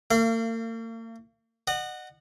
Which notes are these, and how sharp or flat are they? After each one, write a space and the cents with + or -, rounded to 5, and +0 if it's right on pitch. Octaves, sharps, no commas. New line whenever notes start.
A#3 -45 F5 -30
D#5 -35 F#5 +0